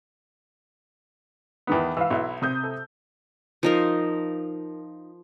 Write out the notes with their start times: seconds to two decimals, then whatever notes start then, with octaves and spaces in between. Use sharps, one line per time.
1.67 E2 D#3 B3
1.97 E3 F5 E6
2.10 B1 E4
2.42 C3 D#6 G6
2.64 A4
3.63 F3 D#4 A#4